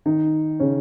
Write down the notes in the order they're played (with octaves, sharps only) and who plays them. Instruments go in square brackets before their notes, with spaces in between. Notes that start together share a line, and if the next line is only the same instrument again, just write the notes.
[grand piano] D#3 D#4
C#3 C#4